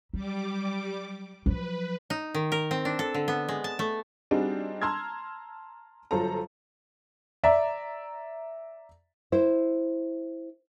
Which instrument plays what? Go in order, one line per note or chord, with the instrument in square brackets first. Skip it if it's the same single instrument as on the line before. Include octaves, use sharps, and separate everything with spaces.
[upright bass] F#3 [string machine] G3 D6
[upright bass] F3 F#3 [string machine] B4
[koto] D#4
D#3
A#4
C4
D4
A4
D3
B3
G#3
A5
A3
[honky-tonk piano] G3 C4 D4 D#4 F#4 G#4
A5 A#5 C6 E6 F6 G#6
G1 F#3 F4 A4 C5 A#5
[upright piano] D5 E5 A#5
[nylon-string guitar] E4 C5